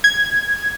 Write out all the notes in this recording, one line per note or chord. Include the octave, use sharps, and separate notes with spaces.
G#6